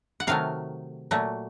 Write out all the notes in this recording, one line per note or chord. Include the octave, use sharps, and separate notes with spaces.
F#5
C3 D#3 F#3 A3 F5
A#2 F#3 A3